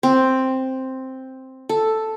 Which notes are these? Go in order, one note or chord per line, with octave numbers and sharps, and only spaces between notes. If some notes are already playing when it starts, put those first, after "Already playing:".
C4
A4